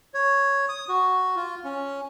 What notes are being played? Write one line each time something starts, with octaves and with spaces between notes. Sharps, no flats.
C#5
D#6
F#4
F4
C#4